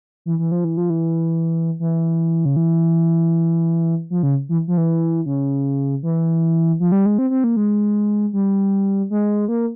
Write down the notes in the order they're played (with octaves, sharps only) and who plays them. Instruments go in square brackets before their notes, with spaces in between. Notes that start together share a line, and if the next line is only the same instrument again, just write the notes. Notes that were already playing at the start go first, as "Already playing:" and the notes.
[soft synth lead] E3
E3
F3
E3
F3
E3
E3
C#3
E3
F3
C#3
E3
F3
E3
C#3
E3
F3
G3
G#3
C4
C4
A#3
G#3
G3
G#3
A#3